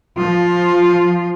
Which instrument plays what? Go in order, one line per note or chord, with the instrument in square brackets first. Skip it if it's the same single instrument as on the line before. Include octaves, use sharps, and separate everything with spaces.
[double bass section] F3 [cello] F4